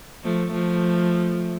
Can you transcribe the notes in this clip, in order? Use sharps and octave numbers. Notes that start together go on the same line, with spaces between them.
F3 A3
F3 A3